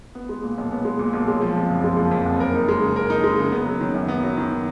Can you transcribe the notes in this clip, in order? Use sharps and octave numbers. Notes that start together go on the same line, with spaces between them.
B3
G#3
A#2
B1
B3
G#3
A#2
B1
G#3
F3
F2
F#1
G#3
F3
F2
F#1
A#4
D#4
G#3
C#3
A#4
D#4
G#3
C#3
B3
F#3
D#3
F#2
B3
F#3
D#3